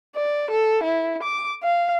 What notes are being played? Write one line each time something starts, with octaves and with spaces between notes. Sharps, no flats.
D5
A4
E4
D6
F5